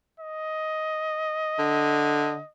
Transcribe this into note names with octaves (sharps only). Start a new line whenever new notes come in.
D#5
D3